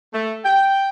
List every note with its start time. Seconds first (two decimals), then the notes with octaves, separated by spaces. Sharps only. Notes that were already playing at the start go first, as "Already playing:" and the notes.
0.13 A3
0.45 G5